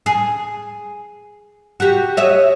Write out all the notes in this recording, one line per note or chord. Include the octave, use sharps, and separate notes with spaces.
G#4
F#4 G4
C#5 D#5 E5